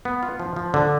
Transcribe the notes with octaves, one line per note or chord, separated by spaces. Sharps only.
B3
F4
F3
F3
D3